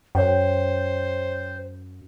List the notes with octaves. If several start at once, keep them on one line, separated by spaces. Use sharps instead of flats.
F#2 C5 C#5 G5